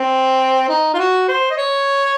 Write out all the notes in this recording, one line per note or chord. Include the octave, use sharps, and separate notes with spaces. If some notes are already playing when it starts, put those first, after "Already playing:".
Already playing: C4
D#4
F4
F#4
C5
D#5
C#5